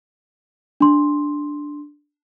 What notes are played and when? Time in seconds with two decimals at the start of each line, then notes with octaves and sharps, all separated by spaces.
0.80 D4 C6